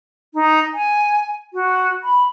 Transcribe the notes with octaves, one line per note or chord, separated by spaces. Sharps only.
D#4
G#5
F#4
B5